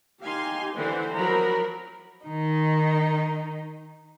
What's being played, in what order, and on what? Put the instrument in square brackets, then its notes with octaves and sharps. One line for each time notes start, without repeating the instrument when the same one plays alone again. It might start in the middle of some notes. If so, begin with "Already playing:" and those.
[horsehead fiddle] D#4 G4 [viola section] F5 G#5 C6
[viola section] D3 E3 C5 [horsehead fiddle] B4 F#5
[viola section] F3 F#3 A#4 [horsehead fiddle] A#5 B5
[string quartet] D#3 D#4